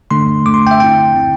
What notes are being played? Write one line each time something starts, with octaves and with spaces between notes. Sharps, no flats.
D3 A3 D4 C6
D3 A3 D4 D6
C6
G5
E5
D3 C4 E4 G5
D3 C4 E4